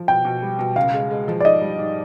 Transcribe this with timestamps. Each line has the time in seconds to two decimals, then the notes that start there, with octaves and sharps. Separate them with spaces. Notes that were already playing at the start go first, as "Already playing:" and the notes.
Already playing: F3
0.08 B2 G5
0.25 B2
0.42 G3
0.59 B2
0.76 C#2 F5
0.94 G#3
1.11 G#3
1.28 F3
1.40 D5
1.45 G#2 D#5
1.61 G3
1.79 G#2